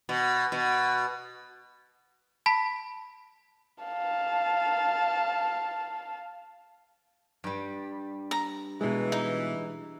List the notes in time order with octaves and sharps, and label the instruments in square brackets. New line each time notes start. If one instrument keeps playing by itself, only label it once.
[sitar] B2
B2
[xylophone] A5 B5 B6
[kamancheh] F5 A5
[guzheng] G2 G3
[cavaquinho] A#5
[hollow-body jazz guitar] B2 G#3 [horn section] E3
[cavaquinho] D#4